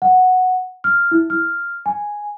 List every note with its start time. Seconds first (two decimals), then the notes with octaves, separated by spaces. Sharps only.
0.02 F#5
0.84 F6
1.12 E4
1.30 F6
1.86 G#5